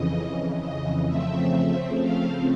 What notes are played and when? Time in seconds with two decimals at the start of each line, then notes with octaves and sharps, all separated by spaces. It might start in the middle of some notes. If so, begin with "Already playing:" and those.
Already playing: F2 C#3 E3 D#5
0.60 D#5
1.07 C#3 F3 A3 C4 E5
2.00 F5